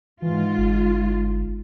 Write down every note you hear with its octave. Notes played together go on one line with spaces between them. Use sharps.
G#2 E3 F4
G1